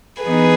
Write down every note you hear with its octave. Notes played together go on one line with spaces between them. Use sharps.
E3 B3 D#4 G#4 B4